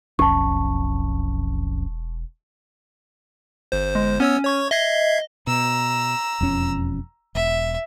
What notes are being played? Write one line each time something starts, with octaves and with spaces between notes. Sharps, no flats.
E1 B1 F2 C#4 A5 C#6
G1 C5
G#3
B3 C#4 C#5 E6
C#5 C#6 G#6
D#5 E5 G#6 C7
B2 A#5 E6
E1 F2 C#4
E1 E5